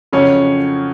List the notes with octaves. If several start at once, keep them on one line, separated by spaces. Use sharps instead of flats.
F2 C#3 F#3 C#4